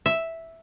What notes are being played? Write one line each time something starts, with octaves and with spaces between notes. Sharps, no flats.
E5